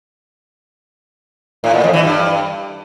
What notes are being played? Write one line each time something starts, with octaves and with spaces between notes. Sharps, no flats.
A2
A#2
F2
E3
G2